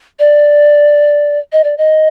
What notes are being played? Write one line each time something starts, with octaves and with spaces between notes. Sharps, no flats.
D5
D#5
D5
D#5